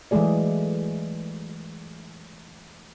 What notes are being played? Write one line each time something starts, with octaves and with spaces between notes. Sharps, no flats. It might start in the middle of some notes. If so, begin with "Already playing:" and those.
E3 F#3 G#3 A3 G#4 D5